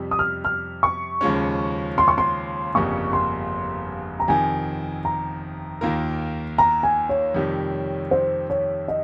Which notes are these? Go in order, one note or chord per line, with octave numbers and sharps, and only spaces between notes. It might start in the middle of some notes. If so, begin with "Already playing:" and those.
Already playing: F2 C3 G3
D#6
F6
F6
C#6
D#2 C#3 F3 G#3 C#4
C6
C#6
C6
G1 F2 C#3 G3 A#3 C#6
C6
A#5
F2 C3 D#3 G#5
A#5
D#2 D#3 A#3 F4 A#4
A#5
G#5
C#5
F2 C3 D#3 G3
C5
C#5
D#5